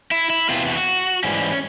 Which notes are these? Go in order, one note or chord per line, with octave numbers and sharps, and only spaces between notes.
E4
E4
E2 C3 E3 F4
F#4
G#2 E3 G3 C#4